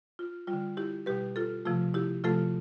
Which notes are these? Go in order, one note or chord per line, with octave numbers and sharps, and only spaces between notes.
F4
G3 F4
D3
E4 G4
B2 G3 G4 B4
F4 A4
C3 F3 A3 F4
E4 G4
C3 F3 A3 F4 A4